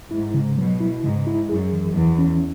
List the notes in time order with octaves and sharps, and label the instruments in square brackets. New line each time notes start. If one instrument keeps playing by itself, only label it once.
[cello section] G#2 [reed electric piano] E4
[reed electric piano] C#3
[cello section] B2 [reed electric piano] F#3
[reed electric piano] E4
[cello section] G#2 [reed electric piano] C#3
[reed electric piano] E4
[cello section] F#2 [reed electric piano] G#4
[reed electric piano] E3
[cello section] E2 [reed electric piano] E3
[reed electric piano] C#4